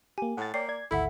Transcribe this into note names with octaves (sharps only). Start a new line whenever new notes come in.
A#3 G4 G#5
A2 F#5 A6
A#3 C#5 D5 G5 C7
D5 G#6
G#1 D2 E4 A4 E5 F#5 B5